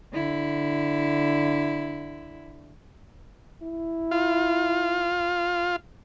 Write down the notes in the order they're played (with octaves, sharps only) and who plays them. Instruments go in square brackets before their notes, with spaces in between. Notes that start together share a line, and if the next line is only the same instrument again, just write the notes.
[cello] D3 E4
[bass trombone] E4
[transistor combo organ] F4